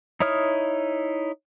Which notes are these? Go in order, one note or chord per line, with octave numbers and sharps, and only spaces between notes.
D#4 E4 C#5 D#6 F6